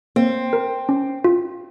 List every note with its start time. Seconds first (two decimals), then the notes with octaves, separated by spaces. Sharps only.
0.16 A#3 C4
0.53 A#4
0.89 C#4
1.24 F4